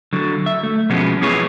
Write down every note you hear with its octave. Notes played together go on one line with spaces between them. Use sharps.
D3 F#3
E5
A3
B2 F3 F#3 G#3 B3 C#4
B3 E4 G#4 B4 C#5